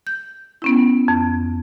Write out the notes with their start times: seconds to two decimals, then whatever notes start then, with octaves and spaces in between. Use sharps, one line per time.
0.07 G6
0.62 B3 C#4 E4
1.08 F2